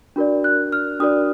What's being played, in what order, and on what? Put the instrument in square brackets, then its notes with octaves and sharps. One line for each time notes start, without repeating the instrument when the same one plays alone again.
[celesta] D4 F#4 A#4 D5
F#6
F6
D4 F#4 A#4 D5 D#6